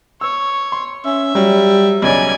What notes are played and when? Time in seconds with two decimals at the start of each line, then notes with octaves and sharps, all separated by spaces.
0.21 C#5 E6
0.72 C6
1.05 C#4 E5
1.35 F#3 G3
2.02 B1 C#3 F#3 D5 G#5